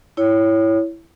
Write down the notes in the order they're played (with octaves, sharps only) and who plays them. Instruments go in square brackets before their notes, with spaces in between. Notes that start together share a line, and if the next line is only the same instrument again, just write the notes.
[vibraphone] E4 C#5